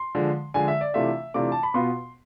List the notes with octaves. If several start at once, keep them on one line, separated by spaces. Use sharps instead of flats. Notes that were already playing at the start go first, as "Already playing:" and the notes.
Already playing: C6
D3 F3 G#3
D3 F3 G#3 G#5
E5
D5
C3 E3 A3 D4 F4 E5
C3 E3 A3 D4 F4 D6
A5
B5
B2 B3 F4 C6